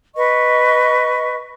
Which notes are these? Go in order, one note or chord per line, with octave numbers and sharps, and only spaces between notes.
B4 D#5 C#6